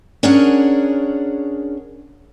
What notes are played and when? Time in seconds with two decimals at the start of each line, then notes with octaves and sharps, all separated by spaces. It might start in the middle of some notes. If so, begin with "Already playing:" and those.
0.23 C#4 D4 G#4 A#4 C#5 F#5